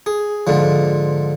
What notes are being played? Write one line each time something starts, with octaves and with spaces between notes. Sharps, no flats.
G#4
G#2 D3 F3